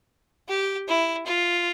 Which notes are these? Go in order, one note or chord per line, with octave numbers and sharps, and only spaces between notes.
G4
E4
F4